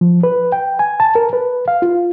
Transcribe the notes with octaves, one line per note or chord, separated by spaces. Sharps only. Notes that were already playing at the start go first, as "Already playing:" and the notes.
F3
B4
G5
G#5
A5
A#4
B4
F5
F4